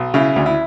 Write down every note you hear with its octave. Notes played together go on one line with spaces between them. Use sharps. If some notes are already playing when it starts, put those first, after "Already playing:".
Already playing: B1
C#3 E4
D2
E4